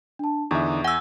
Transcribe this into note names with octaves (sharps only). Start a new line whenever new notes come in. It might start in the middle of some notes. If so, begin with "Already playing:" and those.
D4 A5
E2 D3 D#4 E5 C#6
F#5 G#5 E6